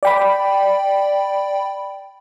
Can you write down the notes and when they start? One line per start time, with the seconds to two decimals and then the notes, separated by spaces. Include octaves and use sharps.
0.03 D5 G5 B5